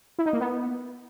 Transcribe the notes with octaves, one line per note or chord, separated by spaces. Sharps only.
E4
D#4
A#3
B3